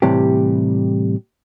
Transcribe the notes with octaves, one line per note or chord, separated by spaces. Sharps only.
A2 C3 E3 G3 G4